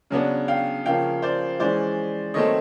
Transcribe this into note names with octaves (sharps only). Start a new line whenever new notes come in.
C#3 F#3 B3 D4
F5 G5
C#3 F3 A#3 C#4 F5 G5
C5 D5
E3 G#3 C#4 C5 D5
D#3 F#3 A3 C4 C#5 D#5